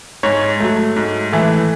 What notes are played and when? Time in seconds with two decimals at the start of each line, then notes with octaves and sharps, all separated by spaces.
0.23 G#2 C#5
0.60 F#3 A3
0.96 G#2
1.32 E3 A3